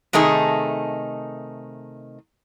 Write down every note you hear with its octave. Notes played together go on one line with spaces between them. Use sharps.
C3 D#3 A3 D#4 G#4